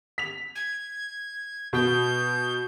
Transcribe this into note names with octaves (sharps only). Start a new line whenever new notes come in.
B6 F7
G#6
B2 G6